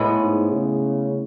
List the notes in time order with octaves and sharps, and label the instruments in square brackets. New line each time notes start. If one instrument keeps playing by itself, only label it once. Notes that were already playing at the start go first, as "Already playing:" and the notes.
Already playing: [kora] A2 G#3 B3
[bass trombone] G#2
C#3